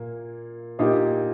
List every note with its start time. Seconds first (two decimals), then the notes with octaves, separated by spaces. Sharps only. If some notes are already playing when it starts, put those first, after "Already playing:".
Already playing: A#2 A#3
0.79 A#2 A#3 D#4 G4